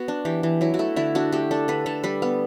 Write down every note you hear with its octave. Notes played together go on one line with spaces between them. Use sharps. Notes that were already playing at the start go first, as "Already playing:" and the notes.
Already playing: B3 F#4
D4
E3 G4
E3
F#3 E4
F#4
A3 E4
D3 E4
D4 F#4
A3 G4
D4 A4
D3 B4
D3 A4
G3 B4
B3